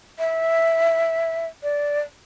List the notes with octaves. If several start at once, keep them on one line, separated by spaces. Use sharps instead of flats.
E5
D5